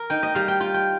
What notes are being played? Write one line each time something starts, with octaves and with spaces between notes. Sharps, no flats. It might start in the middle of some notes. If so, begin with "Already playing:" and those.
Already playing: A#4
D#4 G5
D#5
G3 F5
G5
F4 G5
G5